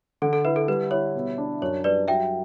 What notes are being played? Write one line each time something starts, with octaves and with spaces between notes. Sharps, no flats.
D3 A4
A4
E4 B4
A4
G3 B4
E4 C#5
B2
D4
F#2 C#5
G3 B4 D5
F#3 E5 G5